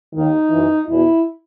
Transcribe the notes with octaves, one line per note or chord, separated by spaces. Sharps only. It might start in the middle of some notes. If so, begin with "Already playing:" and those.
D#2 D#3 D#4
F#2 E3
E2 B2 E4